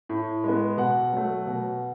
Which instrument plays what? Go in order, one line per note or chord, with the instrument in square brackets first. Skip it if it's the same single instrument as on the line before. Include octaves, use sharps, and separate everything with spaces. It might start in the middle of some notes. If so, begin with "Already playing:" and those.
[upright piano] A2
G#3 B3
B2 F#5
F#3 A3
B2